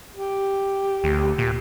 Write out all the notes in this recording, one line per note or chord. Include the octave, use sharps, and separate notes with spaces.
G4
D2
A#2